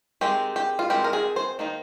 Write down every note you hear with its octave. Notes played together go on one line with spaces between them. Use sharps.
D#3 G#3 C4 D#4 G4
G4
F4
D#3 G#3 C4 D#4 G4
A#4
G#4
C5
D#3 A#3 D#4